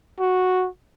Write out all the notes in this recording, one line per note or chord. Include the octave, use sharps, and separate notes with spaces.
F#4